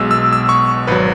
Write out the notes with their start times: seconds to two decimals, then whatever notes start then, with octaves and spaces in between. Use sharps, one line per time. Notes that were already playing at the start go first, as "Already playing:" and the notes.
Already playing: B1 B2 G#3 E6
0.11 E6
0.33 E6
0.49 C#6
0.87 G#1 F#3 B4